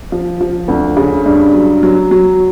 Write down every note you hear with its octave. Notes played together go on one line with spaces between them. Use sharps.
F3
F3
D2
C#3
G2
F#3
F#3
F#3